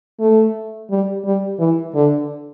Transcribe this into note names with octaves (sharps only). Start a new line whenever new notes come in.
A3
G3
G3
E3
D3